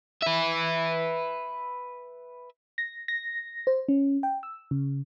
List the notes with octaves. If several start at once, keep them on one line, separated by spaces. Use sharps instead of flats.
B4 E5
A#6
A#6
C5
C#4
G5
E6
C#3